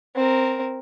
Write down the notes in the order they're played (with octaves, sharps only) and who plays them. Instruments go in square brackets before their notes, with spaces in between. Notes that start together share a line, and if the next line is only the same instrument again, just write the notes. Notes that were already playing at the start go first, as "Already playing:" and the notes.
[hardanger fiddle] C4 A#4